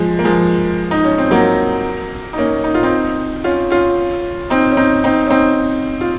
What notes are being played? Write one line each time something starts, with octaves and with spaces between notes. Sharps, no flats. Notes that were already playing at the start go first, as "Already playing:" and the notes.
Already playing: F3 G#3
A#3
F3 G#3
D#4
C#4
C4
F#3 A#3
D#4
A#3 C#4
D#4
F4
C4 D#4
C#4 F4
C#4 F4
C4 D#4
C#4
C4 D#4
C4 D#4
C#4
C4 D#4
F4